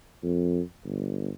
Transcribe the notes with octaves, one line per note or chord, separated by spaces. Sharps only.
F2
G1